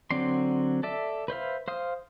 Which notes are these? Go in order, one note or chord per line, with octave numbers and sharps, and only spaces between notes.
D3 F#3 C4 D5 C6
A4 D5 E5
B4 C5 E5 F5
C5 F5 D#6